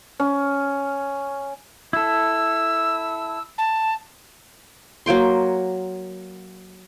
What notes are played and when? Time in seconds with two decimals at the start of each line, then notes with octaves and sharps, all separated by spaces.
0.20 C#4
1.93 E4 A4 E6
3.58 A5
5.06 F#3 A#3 G5 C6